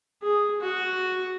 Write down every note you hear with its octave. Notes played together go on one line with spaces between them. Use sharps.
G#4
F#4